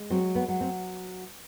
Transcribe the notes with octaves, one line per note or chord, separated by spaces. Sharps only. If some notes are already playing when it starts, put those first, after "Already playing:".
Already playing: G#3
F#3 C4
B3
F#3
C4